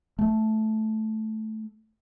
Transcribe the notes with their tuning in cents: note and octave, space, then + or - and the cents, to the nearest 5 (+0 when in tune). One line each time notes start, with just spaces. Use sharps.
A3 -10